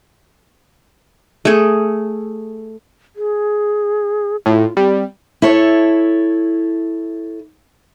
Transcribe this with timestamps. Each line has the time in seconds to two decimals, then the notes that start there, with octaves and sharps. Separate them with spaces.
1.45 A3 G#4
3.16 G#4
4.46 A2 F4
4.77 G3 C4
5.42 E4 A4 C#5